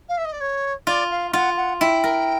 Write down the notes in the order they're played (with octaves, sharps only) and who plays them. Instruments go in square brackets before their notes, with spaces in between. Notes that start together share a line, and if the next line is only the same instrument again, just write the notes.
[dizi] F5
E5
D#5
D5
C#5
[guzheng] F4 [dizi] D5
[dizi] F5
[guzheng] F4 [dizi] F#5
[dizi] F#5
[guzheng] E4 [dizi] G5
[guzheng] A#4